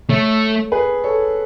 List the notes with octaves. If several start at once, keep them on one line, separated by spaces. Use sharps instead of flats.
A3 A4 C#5
G#4 B4
A4 C#5